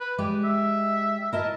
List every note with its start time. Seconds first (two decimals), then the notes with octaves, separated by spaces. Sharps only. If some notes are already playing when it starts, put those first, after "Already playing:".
0.01 B4
0.18 G#3 G4 D5
0.44 E5
1.33 E4 A#4 D#5 A5